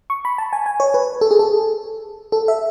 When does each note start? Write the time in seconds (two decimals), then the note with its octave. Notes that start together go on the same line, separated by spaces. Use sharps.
0.10 C#6
0.25 B5
0.38 A5
0.53 G#5
0.66 G#5
0.80 C#5
0.94 B4
1.21 A4
1.31 G#4
1.39 A4
2.32 A4
2.48 E5